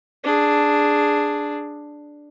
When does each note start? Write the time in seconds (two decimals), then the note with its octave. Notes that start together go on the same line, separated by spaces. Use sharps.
0.23 D4 G#4